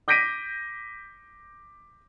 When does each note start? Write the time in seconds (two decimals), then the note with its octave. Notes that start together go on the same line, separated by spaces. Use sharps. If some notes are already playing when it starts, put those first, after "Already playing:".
0.08 D6 G6 A#6 B6 D7 D#7